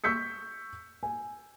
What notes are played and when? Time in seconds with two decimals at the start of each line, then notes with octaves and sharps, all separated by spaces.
0.04 C#6 E6 G6 B6 C#7
1.03 G#5